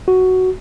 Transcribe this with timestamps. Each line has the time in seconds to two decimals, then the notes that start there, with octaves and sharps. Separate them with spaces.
0.08 F#4